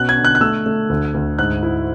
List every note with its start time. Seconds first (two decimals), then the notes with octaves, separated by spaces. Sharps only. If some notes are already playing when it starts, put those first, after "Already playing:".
Already playing: B2 B3 C#4 F#6
0.09 G#6
0.17 D3
0.25 F#6
0.35 F#6
0.41 A3 E6
0.66 A3
0.89 D2
1.14 D2
1.39 G#2 F#6
1.63 E4